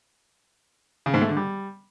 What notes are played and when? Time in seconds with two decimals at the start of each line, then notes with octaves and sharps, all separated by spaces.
1.06 C#3
1.14 G#2
1.21 A3
1.29 D3
1.37 G3